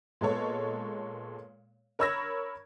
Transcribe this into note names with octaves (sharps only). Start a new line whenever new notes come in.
A#2 G#3 B3 A4 C#5
A#4 C#5 B5 E6 G#6 A#6